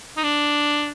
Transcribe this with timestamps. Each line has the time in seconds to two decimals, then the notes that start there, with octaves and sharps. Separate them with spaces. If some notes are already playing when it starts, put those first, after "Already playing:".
0.17 D#4
0.23 D4